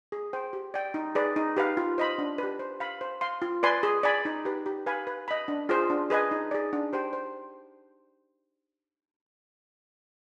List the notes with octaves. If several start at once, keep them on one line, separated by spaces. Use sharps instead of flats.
G#4
C5 G5
G4
D5 G5
D#4
G#4 B4 D5
D#4
G4 B4 F5
F4
C5 D#5 B5
D4
G4 B4
C5
F5 B5
C5
F5 C6
F4
B4 D5 G#5 C6
G#4
D5 G#5 B5
D#4
G4 B4
G4
B4 F5 G#5 B5
B4
D#5 B5
D4
F4 G#4 C5
D4
G#4 B4 D#5 G#5
D#4
G#4 D5
D4
G4 C5 G5
C5